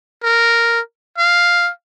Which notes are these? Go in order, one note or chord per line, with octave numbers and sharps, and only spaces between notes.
A#4
F5